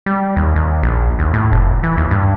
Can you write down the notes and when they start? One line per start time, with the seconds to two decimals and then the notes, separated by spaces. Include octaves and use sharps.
0.06 G3
0.36 D#2
0.56 D#2
0.83 A#1
1.19 D#2
1.34 A2
1.52 F1
1.83 E3
1.97 D#2
2.11 G2